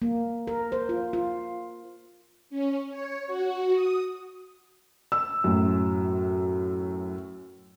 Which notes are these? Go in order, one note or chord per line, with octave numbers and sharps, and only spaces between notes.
A#3
A#4
C5
F4
F4
C#4
C#5
F#4
D#6
E6
F#2 A2